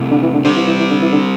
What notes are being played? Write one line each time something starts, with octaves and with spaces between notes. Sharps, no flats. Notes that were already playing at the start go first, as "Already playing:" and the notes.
Already playing: C3 A3 C4 E4
D3
E3
D3
D3 G3 C4 G4 C5
E3
E3
E3
D3
E3
D3